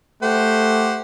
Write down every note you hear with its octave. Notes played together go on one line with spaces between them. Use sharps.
A3 G4 C5 F#5